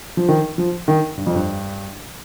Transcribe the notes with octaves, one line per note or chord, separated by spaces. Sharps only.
F3
D#3
F3
D#3
G2
F2
G2